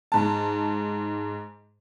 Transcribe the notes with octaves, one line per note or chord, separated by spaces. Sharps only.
G#2 A5